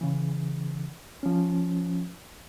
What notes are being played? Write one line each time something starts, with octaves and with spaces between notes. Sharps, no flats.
C#3 E3
F3 C#4